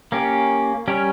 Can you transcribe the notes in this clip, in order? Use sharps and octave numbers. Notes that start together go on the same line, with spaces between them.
A#3 C#4 G4
G3 C#4 G4 A#4 C#5